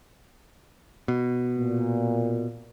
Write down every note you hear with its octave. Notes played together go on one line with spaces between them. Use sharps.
B2
A#2